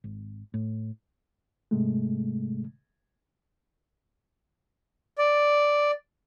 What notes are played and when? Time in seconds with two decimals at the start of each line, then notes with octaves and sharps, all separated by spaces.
0.04 G#1
0.54 A2
1.71 G#2 C3 G#3 A3
5.18 D5